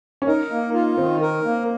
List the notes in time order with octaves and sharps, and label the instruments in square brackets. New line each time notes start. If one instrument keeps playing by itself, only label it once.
[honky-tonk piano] C#4
[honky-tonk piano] D#4 [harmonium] A#4
[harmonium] A#3
F4
[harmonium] D#3 [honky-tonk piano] C4
[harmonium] A#4
A#3